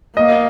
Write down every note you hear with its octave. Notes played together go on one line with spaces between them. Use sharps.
A#3 D#5